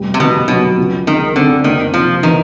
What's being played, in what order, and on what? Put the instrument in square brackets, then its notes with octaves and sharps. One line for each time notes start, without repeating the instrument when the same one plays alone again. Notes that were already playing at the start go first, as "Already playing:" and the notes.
Already playing: [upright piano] F1 G3
[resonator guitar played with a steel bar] C3
[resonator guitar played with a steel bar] B2 [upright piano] D#3
[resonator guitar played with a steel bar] B2 [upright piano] F#3
[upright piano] C#2
[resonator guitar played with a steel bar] D#3 [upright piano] G#3
[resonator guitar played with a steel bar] D3 [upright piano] C4
[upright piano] F#1 [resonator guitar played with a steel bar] D#3
[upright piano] C3 [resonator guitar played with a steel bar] F3
[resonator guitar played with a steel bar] D#3 [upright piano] E3